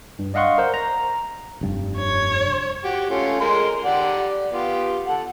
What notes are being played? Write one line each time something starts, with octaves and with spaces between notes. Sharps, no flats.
G2
D5 D#5 F5 F#5 C6 C#6
A#4 C5
A#5
F1 G2
C#5
F#4 G4
A3 C#4 F4
G#3 A#4 C6
G4 D5 F#5
B3 F4 G4
A4 F#5